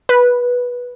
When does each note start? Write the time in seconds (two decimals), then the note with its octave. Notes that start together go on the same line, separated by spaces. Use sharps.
0.09 B4